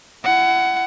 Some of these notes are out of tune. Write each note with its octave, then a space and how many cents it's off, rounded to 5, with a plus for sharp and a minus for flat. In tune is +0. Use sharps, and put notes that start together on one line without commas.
E4 +35 F#5 +15